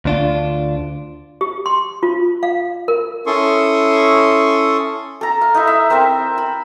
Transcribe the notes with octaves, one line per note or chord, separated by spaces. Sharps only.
D2 D4 F4
G4
C6
F4
F5
A#4
C#4 E4 A4 C6 C#6 D#6
A4 A#5
F5
D#4 E4 E5
E5
C4 A#4 C5 E5
B5